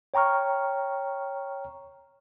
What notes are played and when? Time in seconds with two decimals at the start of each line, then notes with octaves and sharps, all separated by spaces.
0.14 C#5 G5 A#5 C#6 F6